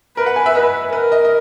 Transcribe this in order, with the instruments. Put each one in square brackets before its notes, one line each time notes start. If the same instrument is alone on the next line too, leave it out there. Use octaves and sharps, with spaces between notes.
[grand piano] A#4 [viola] B4
[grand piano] F#5
G#5
E5
[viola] B4 [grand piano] D#5
[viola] A#4 [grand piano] B4
[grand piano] D#5
D#5